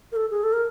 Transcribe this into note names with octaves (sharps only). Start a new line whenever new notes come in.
A#4
A4
G#4
A4
A#4